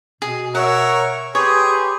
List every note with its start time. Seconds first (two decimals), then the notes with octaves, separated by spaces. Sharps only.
0.22 B2 G#4
0.55 A#4 C#5 E5 F#5
1.35 G4 G#4 B4 C#5 G#5 C6